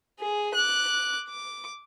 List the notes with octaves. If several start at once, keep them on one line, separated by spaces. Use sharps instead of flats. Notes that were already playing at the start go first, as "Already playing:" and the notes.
G#4
D6 F#6
D6